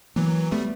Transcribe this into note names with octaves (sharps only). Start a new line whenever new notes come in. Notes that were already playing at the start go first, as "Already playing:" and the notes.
E3 F#3 A#3
G3 A3 B3